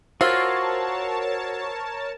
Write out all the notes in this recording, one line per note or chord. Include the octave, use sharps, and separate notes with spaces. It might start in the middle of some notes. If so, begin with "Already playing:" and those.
F4 F#4 A#4 C5 C#5 A5 E6 C7